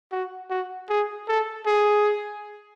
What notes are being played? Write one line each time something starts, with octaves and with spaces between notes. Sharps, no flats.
F#4
F#4
G#4
A4
G#4